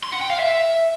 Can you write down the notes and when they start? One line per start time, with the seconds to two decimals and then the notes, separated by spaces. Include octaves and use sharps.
0.03 C6
0.12 F#5
0.21 G5
0.30 F5
0.39 E5